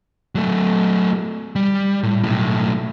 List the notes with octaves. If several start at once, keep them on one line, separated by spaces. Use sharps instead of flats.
F#3 A3
G3
A2
B1 A2